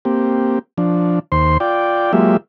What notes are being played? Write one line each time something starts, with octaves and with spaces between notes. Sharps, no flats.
A#3 C4 G4
F3 D4
D#2 C5 C6
F4 D5 G5
F#3 G#3 A#3 F4 G4 E5